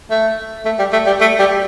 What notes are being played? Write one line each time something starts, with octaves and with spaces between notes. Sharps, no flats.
A3
A3
G3
A3
G3
A3
G3